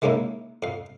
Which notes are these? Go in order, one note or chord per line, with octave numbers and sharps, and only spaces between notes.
D#3 G#3 A#3 C#4 D#4 E4
F2 F5